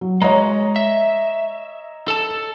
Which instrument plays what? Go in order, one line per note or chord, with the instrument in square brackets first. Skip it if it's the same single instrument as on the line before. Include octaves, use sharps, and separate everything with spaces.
[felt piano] F#3
[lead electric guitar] G#3 [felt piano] C#5 D#5 A#5
[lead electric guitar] E5
A4 A5